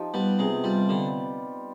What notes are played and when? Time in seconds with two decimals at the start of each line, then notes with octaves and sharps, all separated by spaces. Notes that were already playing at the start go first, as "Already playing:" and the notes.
Already playing: F3 D#4 G4
0.14 G3 B3
0.39 C3 G#3
0.63 G3 F4
0.89 D3 G3